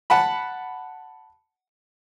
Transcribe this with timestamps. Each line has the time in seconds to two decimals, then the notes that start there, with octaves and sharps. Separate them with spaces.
0.10 F#5 A5 B5